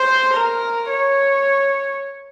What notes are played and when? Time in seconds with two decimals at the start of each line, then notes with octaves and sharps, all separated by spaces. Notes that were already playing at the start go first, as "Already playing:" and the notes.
Already playing: C5
0.33 A#4
0.90 C#5